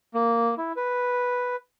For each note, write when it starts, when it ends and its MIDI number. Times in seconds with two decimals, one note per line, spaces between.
0.14 0.55 58
0.58 0.72 64
0.77 1.56 71